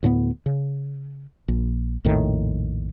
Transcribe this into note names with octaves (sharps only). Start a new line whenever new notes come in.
D2 A2 G#3 B3
C#3
A#1
A#1 F2 A2 D#3